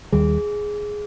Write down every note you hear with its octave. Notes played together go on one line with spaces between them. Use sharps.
D#2 D#3 G3 G#4